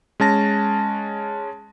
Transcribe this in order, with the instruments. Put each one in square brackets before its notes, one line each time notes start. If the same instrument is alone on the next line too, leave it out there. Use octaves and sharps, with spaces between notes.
[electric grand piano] G#3 C#4 A5 A#6